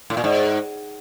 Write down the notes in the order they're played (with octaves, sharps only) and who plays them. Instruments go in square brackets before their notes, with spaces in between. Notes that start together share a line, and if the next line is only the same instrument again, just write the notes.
[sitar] A2
A#2
G#2